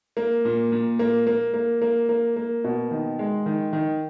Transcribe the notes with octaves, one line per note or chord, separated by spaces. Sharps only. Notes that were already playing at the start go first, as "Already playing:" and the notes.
A#3
A#2
A#2
A#3
A#3
A#3
A#3
A#3
A#3
B2
D#3
G#3
D#3
D#3